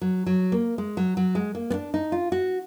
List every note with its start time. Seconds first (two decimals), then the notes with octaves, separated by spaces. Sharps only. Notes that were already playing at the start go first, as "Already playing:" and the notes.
0.01 F#3
0.26 F#3
0.52 A#3
0.78 G#3
0.97 F#3
1.17 F#3
1.35 G#3
1.55 A#3
1.70 B3
1.74 D4
1.94 D#4
2.12 F4
2.32 F#4